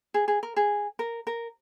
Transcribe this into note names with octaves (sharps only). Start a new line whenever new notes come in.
G#4
G#4
A#4
G#4
A#4
A#4